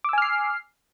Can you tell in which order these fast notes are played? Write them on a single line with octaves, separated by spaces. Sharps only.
D6 E6 G#5 F6 C7